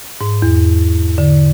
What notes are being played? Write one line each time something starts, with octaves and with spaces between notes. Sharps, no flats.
G#2
E2
D3